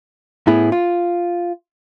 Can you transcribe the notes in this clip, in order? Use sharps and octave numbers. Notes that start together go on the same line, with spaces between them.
A2 B3 E4 G#4
F4